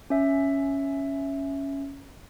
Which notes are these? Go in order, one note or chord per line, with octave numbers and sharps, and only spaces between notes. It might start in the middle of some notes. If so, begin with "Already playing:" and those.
C#4 E5